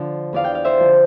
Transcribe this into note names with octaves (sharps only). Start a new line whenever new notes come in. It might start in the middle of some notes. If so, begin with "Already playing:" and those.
Already playing: D3 F3 D5
E2 D5 F5
G5
F5
C5 E5
D3 F3